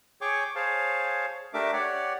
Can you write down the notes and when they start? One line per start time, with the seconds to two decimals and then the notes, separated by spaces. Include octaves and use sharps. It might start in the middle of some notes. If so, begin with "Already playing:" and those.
0.21 G#4 C#5 G5 C#6 D6
0.55 G#4 C5 C#5 F5 A5
1.54 A3 D4 G4 A#4 E5 D6
1.73 G4 C#5 D5 F#5